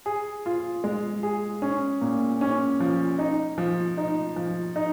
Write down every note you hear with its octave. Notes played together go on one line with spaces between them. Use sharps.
G#4
F4
G#3
G#4
C#4
A#2
C#4
F3
D#4
F3
D#4
F3
D#4